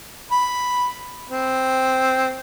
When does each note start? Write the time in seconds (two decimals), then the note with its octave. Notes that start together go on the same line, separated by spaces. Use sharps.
0.31 B5
1.30 C4